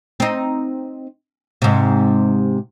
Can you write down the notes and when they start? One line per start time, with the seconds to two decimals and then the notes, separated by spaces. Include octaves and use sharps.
0.20 C4 D#4
1.62 G#2 C3